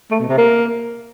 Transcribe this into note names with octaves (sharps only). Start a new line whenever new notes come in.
A3
B2
C3
A#3